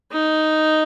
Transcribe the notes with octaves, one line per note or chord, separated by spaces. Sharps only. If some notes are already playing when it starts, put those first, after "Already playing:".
D#4